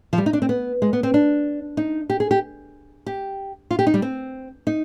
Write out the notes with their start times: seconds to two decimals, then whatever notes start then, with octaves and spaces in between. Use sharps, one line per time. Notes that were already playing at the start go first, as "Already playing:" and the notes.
0.13 F3
0.18 G3
0.26 D#4
0.33 D4
0.42 C4
0.49 B3
0.82 G#3
0.93 B3
1.03 C4
1.14 D4
1.77 D#4
2.10 G4
2.20 G#4
2.31 G4
3.06 G4
3.71 F4
3.79 G4
3.87 D#4
3.94 G3
4.02 C4
4.67 D#4